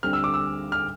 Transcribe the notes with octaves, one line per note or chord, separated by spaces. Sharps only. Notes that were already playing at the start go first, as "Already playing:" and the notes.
D2 D3 G3 C4 F6
E6
D6
E6
F6